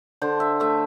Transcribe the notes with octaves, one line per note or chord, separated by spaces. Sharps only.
D3 C5
E5
A3 E5